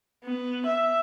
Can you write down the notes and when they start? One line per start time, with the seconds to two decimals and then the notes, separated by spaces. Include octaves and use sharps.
0.25 B3
0.66 E5